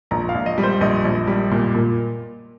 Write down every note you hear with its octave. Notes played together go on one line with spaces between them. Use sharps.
A#1 A#5
F5
A#1
D#5
G3
C5
A#1 D#5
A#1
G3
A#2
A#2